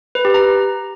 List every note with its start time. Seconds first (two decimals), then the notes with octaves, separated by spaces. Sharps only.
0.15 B4
0.25 G4
0.34 A#5